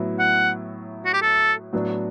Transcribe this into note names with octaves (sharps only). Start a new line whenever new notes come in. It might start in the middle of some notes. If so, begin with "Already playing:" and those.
Already playing: A2 F#3 B3 E4
F#5
F#4
G4
A4
A2 F#3 B3 D4